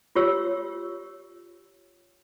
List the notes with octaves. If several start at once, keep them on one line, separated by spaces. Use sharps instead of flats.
F4 G4 C#5 E6